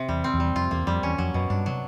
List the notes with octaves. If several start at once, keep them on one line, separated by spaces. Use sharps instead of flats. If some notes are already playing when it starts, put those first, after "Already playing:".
Already playing: C3
E2 G3
C4
E2
G3
F2 F4
E2 A#3
F2 G3
E2 C#4
F2 F#3
F#2 B2
G2 D4
C3 F#3